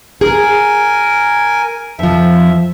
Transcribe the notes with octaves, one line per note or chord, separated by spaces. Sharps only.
G#4 A#4 G#5
F2 F3 E5